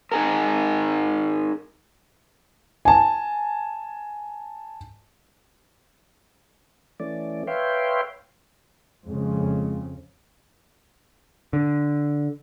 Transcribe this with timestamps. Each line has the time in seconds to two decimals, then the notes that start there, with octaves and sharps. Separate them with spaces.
0.12 D#4 G#4 A#4
2.85 G#5 A5
7.00 E3 A3 C#4 D5
7.47 B4 C#5 E5 F5 G5 C6
9.06 F2 C#3 G#3
11.53 D3